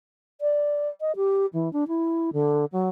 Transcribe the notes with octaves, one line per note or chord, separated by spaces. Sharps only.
D5
D#5
G4
E3
D4
E4
D3
F#3